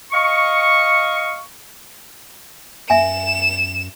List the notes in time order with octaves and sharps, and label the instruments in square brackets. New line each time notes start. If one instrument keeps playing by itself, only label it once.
[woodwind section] D#5 F5 C#6
[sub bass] F#2 [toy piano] E5 G#5 [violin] E7